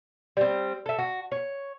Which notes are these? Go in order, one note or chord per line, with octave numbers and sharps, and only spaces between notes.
G3 C4 D5
A4 E5
F#4
C#5